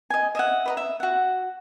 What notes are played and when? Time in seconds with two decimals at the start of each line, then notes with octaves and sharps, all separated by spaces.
0.10 D#5 G#5
0.35 D#5 E5 F#5
0.65 B4 D#5 A#5
0.77 E5
1.00 F#4 F#5